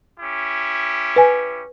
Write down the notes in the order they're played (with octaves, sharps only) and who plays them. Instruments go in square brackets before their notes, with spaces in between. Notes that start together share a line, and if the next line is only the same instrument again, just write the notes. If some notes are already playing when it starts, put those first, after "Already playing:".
[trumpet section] C#4 E4 G4
[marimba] B4 G#5